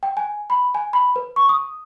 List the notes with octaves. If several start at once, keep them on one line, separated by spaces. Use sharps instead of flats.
G5
G#5
B5
G#5
B5
B4
C#6
D#6